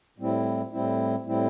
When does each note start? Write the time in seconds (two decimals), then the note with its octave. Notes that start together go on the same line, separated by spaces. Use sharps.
0.18 A2 G3 C4 E4
0.72 A2 G3 C4 E4
1.26 A2 G3 C4 E4